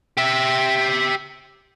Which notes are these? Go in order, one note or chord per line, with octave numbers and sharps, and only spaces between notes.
G4 E5